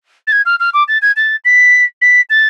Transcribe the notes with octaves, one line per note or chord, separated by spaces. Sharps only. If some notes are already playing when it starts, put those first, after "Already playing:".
A6
G#6
F6
F6
D6
A6
G#6
A6
B6
B6
A6